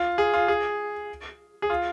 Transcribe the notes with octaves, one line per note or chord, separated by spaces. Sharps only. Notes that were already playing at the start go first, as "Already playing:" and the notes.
Already playing: F4
G#4
F4
G#4
G#4
F4